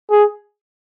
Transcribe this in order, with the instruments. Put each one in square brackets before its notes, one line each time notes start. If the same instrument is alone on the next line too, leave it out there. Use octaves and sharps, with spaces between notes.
[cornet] G#4